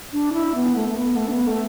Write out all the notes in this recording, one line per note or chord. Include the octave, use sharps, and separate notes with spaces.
D4
E4
B3
A3
A3
B3
A3
D4
B3
A3